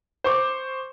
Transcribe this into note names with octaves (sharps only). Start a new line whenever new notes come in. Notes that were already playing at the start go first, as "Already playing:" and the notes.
C5 C#6 D6